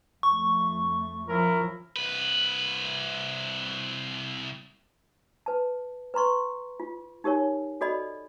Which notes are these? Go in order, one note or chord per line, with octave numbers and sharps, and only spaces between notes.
F2 A3 C#6
F3 C#4 E4 A#4
C2 B4
B4 A5
B4 A#5 C6 C#6
F4
D#4 G4 A#4 C#5 G#5
F#4 A4 D5 D#5 B5